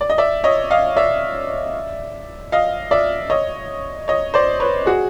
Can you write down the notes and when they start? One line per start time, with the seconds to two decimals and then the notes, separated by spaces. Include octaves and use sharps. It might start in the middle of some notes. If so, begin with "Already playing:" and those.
0.01 D5
0.10 D#5
0.18 D5 E5
0.44 C#5 D#5
0.71 D#5 F5
0.97 D5 E5
2.52 D#5 F5
2.91 D5 E5
3.30 C#5 D#5
4.08 C#5 D#5
4.34 C5 D5
4.60 B4 C#5
4.86 F#4 G#4